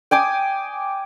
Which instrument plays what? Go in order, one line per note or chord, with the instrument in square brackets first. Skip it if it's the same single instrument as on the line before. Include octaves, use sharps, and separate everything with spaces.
[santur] G5 G#5 D6 D#6